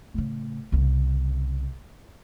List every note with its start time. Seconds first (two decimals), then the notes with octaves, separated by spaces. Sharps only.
0.14 A2 C#3
0.72 C2 C#3